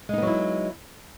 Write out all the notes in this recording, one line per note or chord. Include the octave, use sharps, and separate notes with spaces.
F#3 G#3 B3 D#4 E4